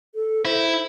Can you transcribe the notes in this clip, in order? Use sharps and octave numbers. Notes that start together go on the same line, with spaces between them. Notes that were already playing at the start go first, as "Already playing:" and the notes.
A4
E4 C5